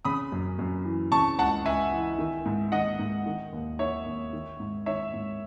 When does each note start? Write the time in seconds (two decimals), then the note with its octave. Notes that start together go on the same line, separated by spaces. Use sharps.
0.05 C#3 B5 D#6
0.32 F#2
0.59 F#2
0.85 E3
1.12 C#3 A5 C#6
1.38 C#2 F#5 A5
1.65 C#2 E5 G#5
1.92 E3
2.18 D#3
2.45 G#2
2.72 D#3 D#5 F#5
2.99 G#2
3.26 D#3
3.53 D#2
3.79 D#3 C#5 E5
4.06 D#2
4.33 D#3
4.60 G#2
4.86 D#3 C#5 E5
5.13 G#2